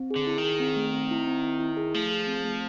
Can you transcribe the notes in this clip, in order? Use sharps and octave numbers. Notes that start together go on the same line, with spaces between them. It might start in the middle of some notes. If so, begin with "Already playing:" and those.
Already playing: C4
G#4
D3
E4
D#3
G#4
C4
A3
C4
E4
C4
E4
E4
G#4
F3 A3
G#4
C4
A3